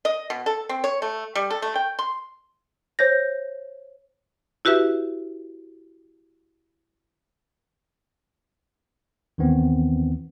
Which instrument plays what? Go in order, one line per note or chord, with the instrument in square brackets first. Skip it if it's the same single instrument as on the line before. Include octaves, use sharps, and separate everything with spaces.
[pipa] D#5
B2
A4
C4
C#5
A3
G3
A4
A3
G5
C6
[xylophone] C5 C#5 G6 A#6
[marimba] E4 F#4 G4 B4 E5
[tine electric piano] D#2 D#3 E3 B3 C4